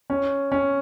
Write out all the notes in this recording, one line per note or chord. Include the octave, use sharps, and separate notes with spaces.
C#4
C#4